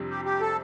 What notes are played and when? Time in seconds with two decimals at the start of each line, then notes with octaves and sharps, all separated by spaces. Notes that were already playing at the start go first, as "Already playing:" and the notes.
Already playing: F2 C3 G3 D4
0.10 G4
0.25 G4
0.41 A4